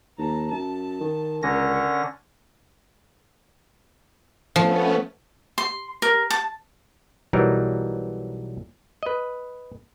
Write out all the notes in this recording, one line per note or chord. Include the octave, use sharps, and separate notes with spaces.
D#2 A5 A#5
F#2 A5
D#3
C#2 D3 C#4 A#4 C#5 A#6
F3 A3 B3 C#4
C6
A#4
A5
B1 E3 F#3 G3 D#4 A#4
B4 D#5